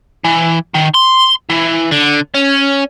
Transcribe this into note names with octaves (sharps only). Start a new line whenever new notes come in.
E3
D#3
C6
E3
D3
C#4